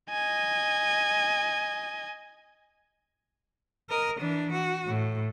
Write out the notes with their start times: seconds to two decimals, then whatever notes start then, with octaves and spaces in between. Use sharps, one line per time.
0.10 D#5 G#5
3.90 A#4 D#5
4.20 E3 D4
4.53 F#4
4.87 A2